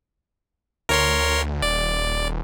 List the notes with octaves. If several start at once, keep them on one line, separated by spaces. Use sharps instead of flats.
D2 A#4 C#5 C6
D#1 D5